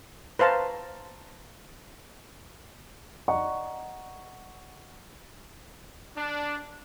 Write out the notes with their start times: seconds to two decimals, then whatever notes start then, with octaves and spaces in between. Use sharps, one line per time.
0.39 B4 C5 F5 A5 A#5
3.28 D5 D#5 F#5 A#5 C#6
6.17 D4